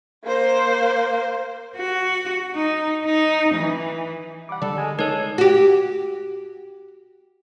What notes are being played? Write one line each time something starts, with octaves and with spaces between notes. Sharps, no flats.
A#3 C5
F#4
D#4
D#4
E3
G3 F#5 D6
D3 G3 A4 D5
G#3 G#5
C#2 G#3 D#4 A4 A#4 C#5 G#6
F#4 G4